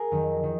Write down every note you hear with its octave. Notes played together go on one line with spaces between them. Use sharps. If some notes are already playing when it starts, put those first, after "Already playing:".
Already playing: G#4 A#4
F2 D#3 F#3
D#3